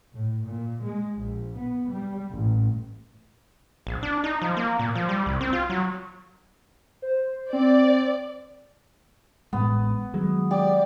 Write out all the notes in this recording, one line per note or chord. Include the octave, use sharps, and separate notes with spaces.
A2
A#2
G#3
A#1
B3
G3
A1
A#1
D4
D#4
F3
A#3
A#2
F3
G3
C2
C4
F4
F#3
C5
C4 D5
A1 A2 G#3 B3
D#3 F#3 G#3
G4 D5